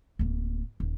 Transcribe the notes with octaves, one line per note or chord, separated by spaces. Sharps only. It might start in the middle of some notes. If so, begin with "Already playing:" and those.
D1 A#3
D#1